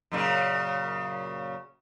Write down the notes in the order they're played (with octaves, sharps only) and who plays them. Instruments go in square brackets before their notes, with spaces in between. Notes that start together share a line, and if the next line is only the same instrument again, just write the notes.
[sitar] F#2 A#2 C#3